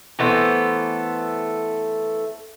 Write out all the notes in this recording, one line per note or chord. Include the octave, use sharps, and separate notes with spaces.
E3 A3 B3 C5